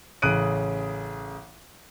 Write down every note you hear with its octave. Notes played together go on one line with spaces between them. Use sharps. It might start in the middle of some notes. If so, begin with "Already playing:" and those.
A1 C#3 D#6 F#6 D7 D#7